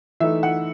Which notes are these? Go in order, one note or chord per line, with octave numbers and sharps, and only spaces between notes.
E3 A3 D#4 E5
F#5